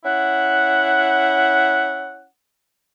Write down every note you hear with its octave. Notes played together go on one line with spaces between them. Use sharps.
C#4 E4 F#5